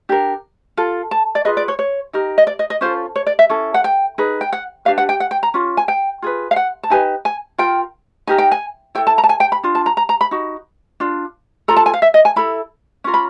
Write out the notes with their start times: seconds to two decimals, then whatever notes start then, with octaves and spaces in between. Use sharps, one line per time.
0.09 D4 G4 A#4
0.77 F4 A4
1.11 A5
1.35 D5
1.45 F4 G#4 B4 D#5
1.57 D5
1.68 C#5
1.79 C#5
2.13 D#4 G4 A#4
2.38 D#5
2.47 D5
2.59 D#5
2.70 D#5
2.81 C#4 F4 A4 C5
3.16 C#5
3.26 D5
3.39 E5
3.50 C#4 E4 A4
3.74 F#5
3.84 G5
4.18 D#4 G#4 B4
4.41 G5
4.52 F#5
4.85 D4 G4 B4 F5
4.98 F#5
5.09 G5
5.20 F#5
5.31 G5
5.43 A#5
5.54 C#4 F4
5.77 G#5
5.88 G5
6.22 F4 G#4 B4
6.51 F5
6.56 F#5
6.83 A5
6.90 D#4 G4 B4 G#5
7.25 G#5
7.58 F4 A#4 G5
8.27 D#4 G4 A#4 G#5
8.38 G5
8.51 G#5
8.95 E4 A4 G5
9.07 A5
9.18 A#5
9.24 A5
9.29 G#5
9.40 G5
9.52 B5
9.63 D4 F4
9.75 A5
9.86 A#5
9.97 A#5
10.09 A#5
10.21 B5
10.31 D#4 F#4
11.00 D4 F4
11.68 F4 A4 A#5
11.76 A5
11.86 G#5
11.94 F5
12.02 E5
12.14 D#5
12.25 G#5
12.36 E4 A4 B5
13.04 C#4 F4 A#4
13.14 B5